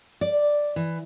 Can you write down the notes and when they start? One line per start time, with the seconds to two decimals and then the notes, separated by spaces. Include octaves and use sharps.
0.21 D5
0.76 E3